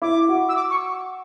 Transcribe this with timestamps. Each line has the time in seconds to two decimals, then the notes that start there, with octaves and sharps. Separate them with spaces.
0.02 E4 D6
0.29 F#4
0.49 E6
0.56 D6
0.70 C#6